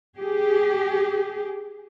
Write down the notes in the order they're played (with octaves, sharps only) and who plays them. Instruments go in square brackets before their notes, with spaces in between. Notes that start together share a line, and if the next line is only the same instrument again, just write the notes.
[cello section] G4 G#4